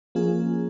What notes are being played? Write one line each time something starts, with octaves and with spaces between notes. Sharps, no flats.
F3 A#3 C#4 F4 G#4